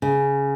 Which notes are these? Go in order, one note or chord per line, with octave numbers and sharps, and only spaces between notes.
C#3